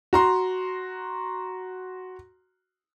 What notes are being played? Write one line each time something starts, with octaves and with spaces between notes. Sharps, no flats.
F#4 A#5 C6